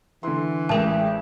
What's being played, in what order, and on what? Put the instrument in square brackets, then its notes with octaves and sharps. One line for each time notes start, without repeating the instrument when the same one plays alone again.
[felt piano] D3 C6 [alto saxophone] E3
[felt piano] A1 E7 [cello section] G#3 G4 [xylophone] A#4 A5